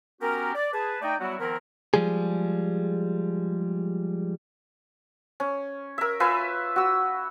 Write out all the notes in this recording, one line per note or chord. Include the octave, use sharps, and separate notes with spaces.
B3 C#4 F#4 G4 A#4
D5
G#4 B4 A5
A3 D#4 D5 D#5 G5
F#3 G3 B3 E4 F#4
D#3 F3 B3 C4 E4 A#4
F3 G3 G#3 G#4
C#4
A#4 E5
F4 B4 E5 G#5
F#4 E6